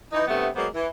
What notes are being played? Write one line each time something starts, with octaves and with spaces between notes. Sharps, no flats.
E3 D#4
G2 C3 A3 B3
F#3 G#3 A#3 B3 C5
E3